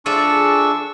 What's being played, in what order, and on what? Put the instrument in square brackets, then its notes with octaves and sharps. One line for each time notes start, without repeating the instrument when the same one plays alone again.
[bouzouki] F3 A3 G#4 [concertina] D4 C#6 E6